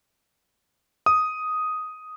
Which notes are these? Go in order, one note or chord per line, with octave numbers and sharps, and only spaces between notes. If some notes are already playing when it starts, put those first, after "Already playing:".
D#6